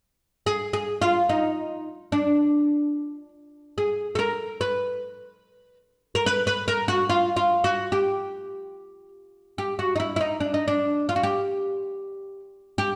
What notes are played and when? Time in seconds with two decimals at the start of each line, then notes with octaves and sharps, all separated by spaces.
0.46 G#4
0.73 G#4
1.02 F4
1.29 D#4
2.12 D4
3.78 G#4
4.15 A4
4.19 A#4
4.61 B4
6.15 A#4
6.26 B4
6.47 B4
6.68 A#4
6.88 F#4
7.10 F4
7.36 F4
7.64 F#4
7.92 G4
9.58 G4
9.79 F#4
9.96 D#4
10.00 E4
10.16 E4
10.21 D#4
10.40 D4
10.54 D#4
10.68 D4
11.09 F4
11.16 F#4
11.23 G4
12.78 G4